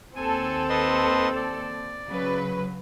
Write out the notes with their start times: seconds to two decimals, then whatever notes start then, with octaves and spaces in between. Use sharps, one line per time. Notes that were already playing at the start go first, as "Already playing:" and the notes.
0.16 D#2 C4 A4 G#5
0.69 B4 D#5 C6
1.36 D5
2.09 C#3 F#3 B4